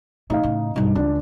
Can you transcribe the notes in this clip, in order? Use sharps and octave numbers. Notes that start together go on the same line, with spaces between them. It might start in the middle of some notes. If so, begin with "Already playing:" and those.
A2 D#4 D#5 F5
A2 C#3
B1 G2 D#4
C#2 D4